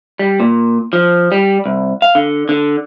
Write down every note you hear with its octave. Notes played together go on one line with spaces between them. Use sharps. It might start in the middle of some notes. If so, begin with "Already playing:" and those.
G3
A#2
F3
G3
C2
F5
D3
D3